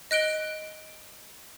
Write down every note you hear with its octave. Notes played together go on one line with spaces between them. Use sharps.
D#5 F#6 D7 G7